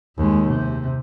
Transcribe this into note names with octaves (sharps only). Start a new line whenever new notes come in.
D#2 G#3
C3